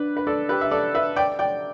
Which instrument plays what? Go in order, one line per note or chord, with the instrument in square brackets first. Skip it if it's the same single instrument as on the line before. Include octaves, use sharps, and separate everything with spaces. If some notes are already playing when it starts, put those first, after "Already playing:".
Already playing: [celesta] D4 [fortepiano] B4 D5
[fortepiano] B4
A4 D5
G4 B4
E5
A4 D5
B4 E5
D5 G5
D5 G5